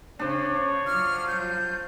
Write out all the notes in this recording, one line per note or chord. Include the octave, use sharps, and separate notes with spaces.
C#3 D4 C5 C#5
F#3 F4 F6
G6